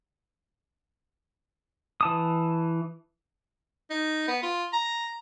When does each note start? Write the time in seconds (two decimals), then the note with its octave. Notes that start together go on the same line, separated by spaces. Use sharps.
2.01 E3 A5 D#6
3.90 D#4
4.28 B3
4.43 F4
4.73 A#5